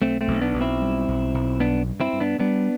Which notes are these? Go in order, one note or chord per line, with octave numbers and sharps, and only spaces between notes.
B1 A3 C4
A3 C4
B1
B3 D4
B1
C4 E4
G3
B1
B1
G2 B3 D4
G2
C4 E4
G2
B3 D4
G3 B3 D4